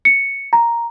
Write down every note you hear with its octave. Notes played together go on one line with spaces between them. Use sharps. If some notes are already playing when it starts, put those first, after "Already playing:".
C#7
A#5